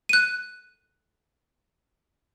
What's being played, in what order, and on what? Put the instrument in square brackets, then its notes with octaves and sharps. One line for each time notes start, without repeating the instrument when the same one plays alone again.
[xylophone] F#6 D#7